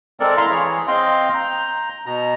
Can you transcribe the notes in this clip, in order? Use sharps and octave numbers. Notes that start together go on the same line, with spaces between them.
G#3 C4 A4 A#4 D5
E4 E5 F5 A#5 C6
E3 G#4 C#5
C4 D#5 F5 G5 C6
A#5 G6
B2 A#5